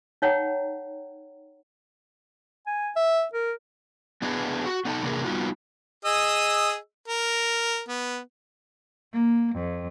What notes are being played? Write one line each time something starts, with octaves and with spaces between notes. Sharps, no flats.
D#4 C#5 F#5 G5 A#5
G#5
E5
A#4
B3 D4 E4 G#4 B4 D#5
F#4
B3 D4 D#4 A4 D#5 A5
C3 E3 A#3 D4 G#4 A#4
G3 B3 C#4 D#4 F4 F#4
G#4 D#5 E6
A#4
B3
A#3
F2